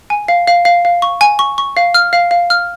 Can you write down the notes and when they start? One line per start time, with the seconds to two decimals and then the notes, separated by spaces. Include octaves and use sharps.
0.10 G#5
0.28 F5
0.48 F5
0.65 F5
0.85 F5
1.02 C#6
1.21 G#5
1.39 C#6
1.58 C#6
1.77 F5
1.94 F6
2.13 F5
2.31 F5
2.50 F6